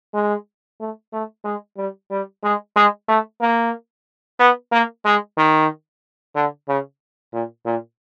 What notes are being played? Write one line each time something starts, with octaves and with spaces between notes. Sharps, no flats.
G#3
A3
A3
G#3
G3
G3
G#3
G#3
A3
A#3
B3
A#3
G#3
D#3
D3
C#3
A#2
A#2